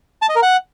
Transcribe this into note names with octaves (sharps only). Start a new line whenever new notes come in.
A5
D#5
A#4
F#5